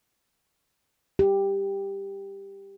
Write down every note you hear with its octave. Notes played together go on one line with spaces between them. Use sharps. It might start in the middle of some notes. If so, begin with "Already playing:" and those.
G4